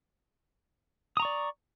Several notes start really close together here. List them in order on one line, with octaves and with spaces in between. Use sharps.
D#6 A#5 C#6 D5